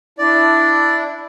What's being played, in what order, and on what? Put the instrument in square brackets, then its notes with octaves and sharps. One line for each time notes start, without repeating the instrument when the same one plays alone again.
[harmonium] D4 E4 [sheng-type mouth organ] D5